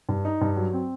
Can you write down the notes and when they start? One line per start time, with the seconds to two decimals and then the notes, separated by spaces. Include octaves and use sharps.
0.09 G2
0.25 D#4
0.41 G2
0.56 F#3
0.73 C4